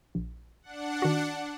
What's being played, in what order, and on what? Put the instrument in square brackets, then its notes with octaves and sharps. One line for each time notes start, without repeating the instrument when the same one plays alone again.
[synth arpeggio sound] A#1
[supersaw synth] D4 F#5
[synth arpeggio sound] D#3 F#4